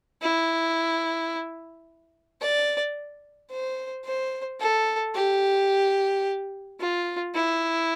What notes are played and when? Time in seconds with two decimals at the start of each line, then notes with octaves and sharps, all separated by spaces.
0.22 E4
2.41 D5
3.51 C5
4.05 C5
4.60 A4
5.15 G4
6.80 F4
7.34 E4